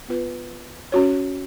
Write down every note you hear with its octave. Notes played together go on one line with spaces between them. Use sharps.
B3 F4 B4
C#4 F#4 C#5